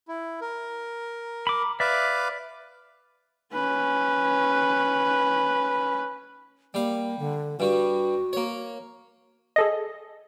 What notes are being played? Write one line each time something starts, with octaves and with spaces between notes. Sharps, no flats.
E4
A#4
B5 D6
B4 D5 E5 F5 D6
C#4 B4
G3 A#3 F5
D3
G2 G3 F#4
A#3 C#5
G#4 A4 D#5